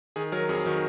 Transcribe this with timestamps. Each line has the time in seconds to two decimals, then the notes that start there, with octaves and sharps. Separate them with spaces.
0.16 D#3 G#4
0.32 F#3 A#4
0.49 F2 G#4
0.66 D#3 F#4